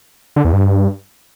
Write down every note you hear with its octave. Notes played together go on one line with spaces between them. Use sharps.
D3
E2
G2